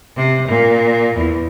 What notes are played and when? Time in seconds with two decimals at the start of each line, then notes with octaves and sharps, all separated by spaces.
0.16 C3
0.48 A#2
1.16 E2